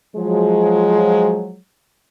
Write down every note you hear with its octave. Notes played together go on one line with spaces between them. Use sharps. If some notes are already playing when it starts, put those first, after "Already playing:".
F3 F#3 G#3